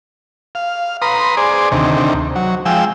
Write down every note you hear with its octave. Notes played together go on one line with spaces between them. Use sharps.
F5
B4 A#5 C6 D#6
G#4 C5 D5
D2 C3 D#3
F#3
F3 G#3 G5 E6